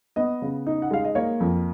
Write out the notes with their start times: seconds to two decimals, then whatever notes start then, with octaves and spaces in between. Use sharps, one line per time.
0.16 B3 D#5
0.42 C#3
0.67 D#4
0.82 F#5
0.91 G#3 F5
1.05 D#5
1.15 A#3 C#5
1.40 F2